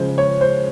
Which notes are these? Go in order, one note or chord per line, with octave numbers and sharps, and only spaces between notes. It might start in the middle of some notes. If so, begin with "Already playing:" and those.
Already playing: C#3 F3 G#3 C5
C#5
C5